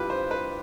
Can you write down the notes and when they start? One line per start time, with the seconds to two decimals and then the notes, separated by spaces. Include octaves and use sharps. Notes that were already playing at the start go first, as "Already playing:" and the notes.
Already playing: G2 E4 F4 G4 B4
0.10 C5
0.31 B4